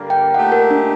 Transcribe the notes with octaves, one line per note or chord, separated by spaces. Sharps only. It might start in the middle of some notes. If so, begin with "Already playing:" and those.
Already playing: G2 D3 G3 A#3
G5
A#2 A3 D#4 G4 F#5
A#4
D4